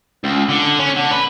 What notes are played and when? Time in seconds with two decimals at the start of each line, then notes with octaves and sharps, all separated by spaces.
0.24 C#2
0.49 D3
0.79 C#4
0.96 D3
1.11 B4